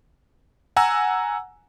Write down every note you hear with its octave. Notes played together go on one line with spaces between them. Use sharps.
F#5 G#5 A#5 E6